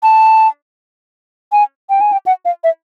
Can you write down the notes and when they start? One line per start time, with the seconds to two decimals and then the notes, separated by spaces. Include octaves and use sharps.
0.03 A5
1.52 G#5
1.90 G5
2.01 G#5
2.12 G5
2.26 F#5
2.45 F5
2.64 E5